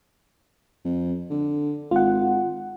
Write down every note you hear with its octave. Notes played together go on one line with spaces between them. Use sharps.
F2
D3
G#1 F4 F#5